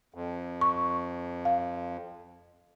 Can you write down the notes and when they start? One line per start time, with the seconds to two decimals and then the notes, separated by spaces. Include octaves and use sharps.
0.14 F2
0.61 C#6
1.45 F5